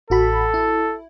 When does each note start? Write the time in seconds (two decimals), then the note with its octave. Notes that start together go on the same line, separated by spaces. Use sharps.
0.10 A1 F#4 A4 B5
0.54 E4